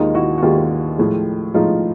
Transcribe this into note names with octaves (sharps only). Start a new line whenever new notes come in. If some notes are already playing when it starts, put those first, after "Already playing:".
Already playing: D#2 D#3 G#3 D#4 F4
E4 F#4
F#4
D#2 D#3 G#3 F4 G4
A2 F3 G#3
A2 F3 G#3 D#4 F4